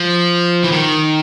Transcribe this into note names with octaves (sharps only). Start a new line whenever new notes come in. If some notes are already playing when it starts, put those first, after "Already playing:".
Already playing: F3
E3
D#3